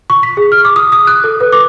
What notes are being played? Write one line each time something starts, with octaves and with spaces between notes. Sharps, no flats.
C#6
B6
G#4
F6
D6
D#6
D#6
F#6
A4
B4
D6